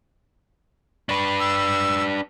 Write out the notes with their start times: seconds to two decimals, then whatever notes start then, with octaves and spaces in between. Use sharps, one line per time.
1.09 D4 B4 C#6
1.40 E6